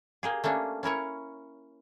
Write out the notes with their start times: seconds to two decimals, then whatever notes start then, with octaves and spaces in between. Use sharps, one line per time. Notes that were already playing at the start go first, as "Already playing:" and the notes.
0.23 A#3 G4 G#4
0.44 A3 A#3 C#4 D4
0.83 C#4 E4 A#4 C#5